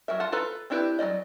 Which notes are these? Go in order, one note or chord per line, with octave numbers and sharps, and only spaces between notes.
F#3 F#4 A#4 E5
F4 F#5 A5
F4 A4 B4 A#5
C4 D4 E4 G4 B4
F#3 A#3 D5 D#5